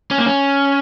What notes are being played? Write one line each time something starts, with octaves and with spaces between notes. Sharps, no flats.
C#4
A#3
C#4